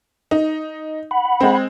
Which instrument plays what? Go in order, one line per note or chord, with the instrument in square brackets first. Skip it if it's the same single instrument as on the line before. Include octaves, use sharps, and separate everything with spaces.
[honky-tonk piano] D#4
[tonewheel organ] F#5 B5
[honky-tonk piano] G#3 C4